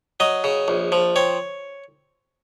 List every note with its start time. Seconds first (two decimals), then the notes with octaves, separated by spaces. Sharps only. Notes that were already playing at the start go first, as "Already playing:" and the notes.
0.20 F#3 D#5
0.44 C#3
0.68 A#1
0.92 F3
1.16 C4 C#5